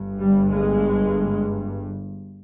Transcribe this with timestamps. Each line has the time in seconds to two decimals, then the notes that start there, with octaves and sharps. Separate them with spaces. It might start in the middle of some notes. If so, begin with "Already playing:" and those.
Already playing: G1 G2
0.19 G3
0.49 G#3